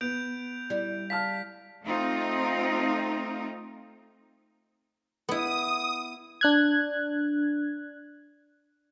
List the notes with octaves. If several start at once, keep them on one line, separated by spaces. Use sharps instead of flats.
B3 G6 D7 F7
G3 E4
F5 A5 F6 B6
A3 C4 D#4 F4
B3 E4 D#6
D4 F#6 G#6